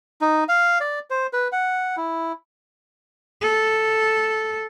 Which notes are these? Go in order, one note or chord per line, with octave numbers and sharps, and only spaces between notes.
D#4
F5
D5
C5
B4
F#5
E4
A4